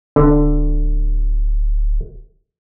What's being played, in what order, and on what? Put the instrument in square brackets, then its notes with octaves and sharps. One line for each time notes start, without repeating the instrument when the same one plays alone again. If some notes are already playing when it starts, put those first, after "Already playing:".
[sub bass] D1 [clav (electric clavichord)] D3